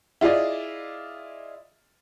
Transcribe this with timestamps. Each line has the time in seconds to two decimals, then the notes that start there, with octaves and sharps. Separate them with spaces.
0.21 E4 F4 G#4 D5 D#5